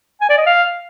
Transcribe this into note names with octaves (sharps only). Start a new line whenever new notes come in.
G#5
D5
D#5
F5